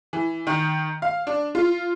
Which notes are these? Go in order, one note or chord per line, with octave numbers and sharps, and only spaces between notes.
E3
D#3
F5
D4
F4